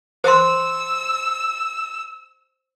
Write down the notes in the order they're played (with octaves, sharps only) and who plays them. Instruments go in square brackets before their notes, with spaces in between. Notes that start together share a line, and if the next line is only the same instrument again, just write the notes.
[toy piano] C5 C6 [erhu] E6